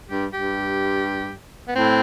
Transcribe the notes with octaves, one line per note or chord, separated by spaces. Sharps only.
G2 G4
G2 G4
B3
A2 C4